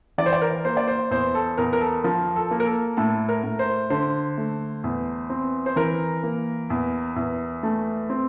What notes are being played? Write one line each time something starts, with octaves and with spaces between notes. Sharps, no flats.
E3 D5
C5
D5
A#4
A#3 C5
D5
C5
E2 C5
A4
E2 A#4
A#4
A4
F3 A#4
A4
A#3
A#4
A4
A2 A4
A#4
A2
C5
D3 C5
A3
E2
C4
C5
E3 A#4
A#3
E2
E2
A3
C4